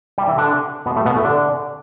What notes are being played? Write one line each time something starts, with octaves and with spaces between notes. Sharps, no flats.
G3 G4
E3 E4
D3 D4
B2 B3
A2 A3
B2 B3
A2 A3
D3 D4